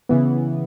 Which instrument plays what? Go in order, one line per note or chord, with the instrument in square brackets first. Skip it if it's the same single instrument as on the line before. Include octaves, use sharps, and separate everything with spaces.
[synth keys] C#3 E3 B3